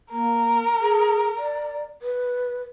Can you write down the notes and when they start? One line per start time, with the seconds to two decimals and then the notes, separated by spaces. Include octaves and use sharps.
0.11 A#3 A#4
0.81 G#4
1.38 D5
2.02 B4